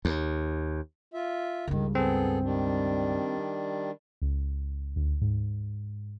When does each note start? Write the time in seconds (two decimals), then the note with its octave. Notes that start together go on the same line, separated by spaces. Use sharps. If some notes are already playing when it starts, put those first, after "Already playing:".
0.05 D#2
1.14 F4 E5
1.67 C#2 G2 D#3
1.95 B3 C4 G#4 A4
2.44 D#3 G3 D4
4.22 C#2
4.96 D2
5.21 G#2